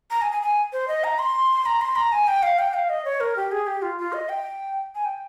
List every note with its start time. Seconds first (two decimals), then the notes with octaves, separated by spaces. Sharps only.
0.11 A#5
0.22 G#5
0.32 G#5
0.42 G#5
0.73 C5
0.88 D#5
1.04 A#5
1.19 C6
1.66 A#5
1.81 C6
1.96 A#5
2.12 G#5
2.27 G5
2.43 F5
2.59 G5
2.74 F5
2.89 D#5
3.05 C#5
3.20 A#4
3.36 G4
3.52 G#4
3.67 G4
3.82 F4
3.98 F4
4.13 D#5
4.29 G5
4.95 G#5
5.05 G5